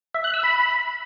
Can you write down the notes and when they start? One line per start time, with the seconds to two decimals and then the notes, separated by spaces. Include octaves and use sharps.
0.15 E5
0.24 F#6
0.34 E6
0.43 B5